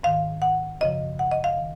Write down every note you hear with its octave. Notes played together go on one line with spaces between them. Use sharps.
G#2 D#3 F5
F#5
F#2 C#3 F3 D#5
F#5
D#5
F5
D#3